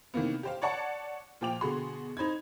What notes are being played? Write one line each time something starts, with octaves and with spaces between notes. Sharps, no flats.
C3 D#3 E3 A#3 B3
G4 C5 F5
C#5 D5 F#5 A5 C#6
A#2 F3 G5 D6 F7
B2 D3 F#4 G#4 C6
D#4 C5 B5 G#6